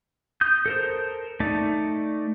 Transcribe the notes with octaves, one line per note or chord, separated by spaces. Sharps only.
D#6 G6
A4 A#4 C5
A3 D#4 D5